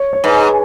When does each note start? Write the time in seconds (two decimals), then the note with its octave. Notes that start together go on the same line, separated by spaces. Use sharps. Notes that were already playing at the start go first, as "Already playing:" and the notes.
Already playing: C#5
0.13 C#5
0.24 G#2 B4